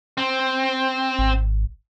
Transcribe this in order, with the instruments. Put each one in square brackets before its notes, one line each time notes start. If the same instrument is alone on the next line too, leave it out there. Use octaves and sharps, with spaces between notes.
[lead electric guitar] C4
[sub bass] G#1